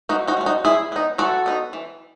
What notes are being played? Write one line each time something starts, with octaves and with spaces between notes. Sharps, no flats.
E3 D#4 F#4
D#4 F#4
A3 C#4
D#4 F#4
E3 E4 G#4
B3 D#4
E3 F#4 A4
B3 D#4
E3